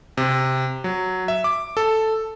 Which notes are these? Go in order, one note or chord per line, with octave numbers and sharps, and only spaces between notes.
C3
F#3
E5
D6
A4